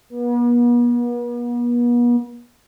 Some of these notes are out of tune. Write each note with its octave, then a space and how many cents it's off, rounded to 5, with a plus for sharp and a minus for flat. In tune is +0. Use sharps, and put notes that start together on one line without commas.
B3 -45